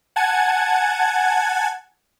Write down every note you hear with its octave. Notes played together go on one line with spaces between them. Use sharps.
F#5 G#5 A5 G#6